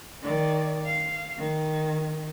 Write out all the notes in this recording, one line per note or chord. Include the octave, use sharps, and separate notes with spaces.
D#3 D5
F5
D#3